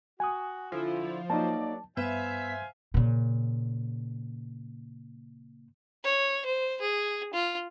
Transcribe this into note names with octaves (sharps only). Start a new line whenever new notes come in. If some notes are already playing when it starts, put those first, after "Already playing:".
F#4 G#5 D#6
D3 F3 E4
F#3 A#3 D#4 D5 A5
G2 B3 C5 E5 F5 G#5
A#2 C#3
C#5
C5
G#4
F4